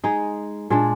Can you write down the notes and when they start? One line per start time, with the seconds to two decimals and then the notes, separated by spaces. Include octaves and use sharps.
0.04 G#3 D#4 G#4
0.70 A#2 G#3 D4